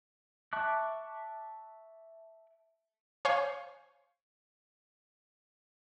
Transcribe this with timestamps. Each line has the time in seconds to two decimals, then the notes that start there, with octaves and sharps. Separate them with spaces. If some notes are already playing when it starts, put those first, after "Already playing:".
0.53 E5 A5 C#6 D6 F#6
3.25 C5 C#5 F5 G#5 C#6